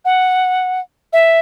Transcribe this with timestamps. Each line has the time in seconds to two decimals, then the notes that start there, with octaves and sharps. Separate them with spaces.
0.05 F#5
1.13 E5